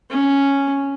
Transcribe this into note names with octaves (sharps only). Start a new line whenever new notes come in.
C#4